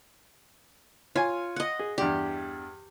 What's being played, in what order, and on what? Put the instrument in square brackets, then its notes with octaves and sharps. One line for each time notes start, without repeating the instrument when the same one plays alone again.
[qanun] F4 [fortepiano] C#5 G#5
[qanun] D#5 F#5
[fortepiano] G#4
[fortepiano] E2 G2 D5 [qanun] G4